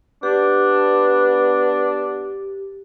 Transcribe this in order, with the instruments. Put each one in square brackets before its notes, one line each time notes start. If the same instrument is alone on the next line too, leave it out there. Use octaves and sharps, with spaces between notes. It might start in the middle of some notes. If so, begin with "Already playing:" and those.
[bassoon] B3 [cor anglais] D4 [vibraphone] G4